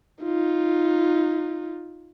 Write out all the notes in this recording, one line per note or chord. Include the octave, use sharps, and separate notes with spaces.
D#4 F4